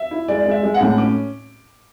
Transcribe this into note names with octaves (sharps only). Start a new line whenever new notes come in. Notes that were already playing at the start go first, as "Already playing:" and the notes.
Already playing: E5
E4
G#3 D5
G#3
E5
G#3
F#5
A2
C#4 D6